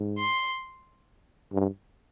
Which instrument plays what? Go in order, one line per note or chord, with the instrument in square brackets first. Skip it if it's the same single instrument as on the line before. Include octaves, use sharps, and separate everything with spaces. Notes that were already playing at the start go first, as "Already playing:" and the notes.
Already playing: [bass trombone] G#2
[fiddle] C6
[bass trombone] G2